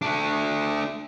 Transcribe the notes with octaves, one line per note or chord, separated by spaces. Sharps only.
A3 D4